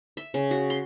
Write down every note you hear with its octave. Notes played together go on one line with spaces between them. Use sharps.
E5
C#3
F#4
C6